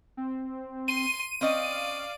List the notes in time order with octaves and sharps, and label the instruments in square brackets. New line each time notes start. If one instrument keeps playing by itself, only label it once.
[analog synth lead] C4
[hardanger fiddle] C6 [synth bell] D#7
[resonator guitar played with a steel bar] C4 C#4 D#5 [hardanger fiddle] D5 [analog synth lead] F5